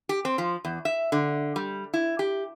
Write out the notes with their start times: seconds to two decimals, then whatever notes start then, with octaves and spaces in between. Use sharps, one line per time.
0.09 G4
0.25 C4
0.38 F3
0.65 E2
0.85 E5
1.12 D3
1.56 G3
1.94 E4
2.19 G4